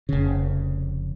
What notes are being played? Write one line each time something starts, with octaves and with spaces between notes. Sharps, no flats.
F1 C#3